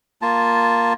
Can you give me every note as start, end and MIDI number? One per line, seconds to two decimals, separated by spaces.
0.22 0.93 58
0.22 0.93 65
0.22 0.93 81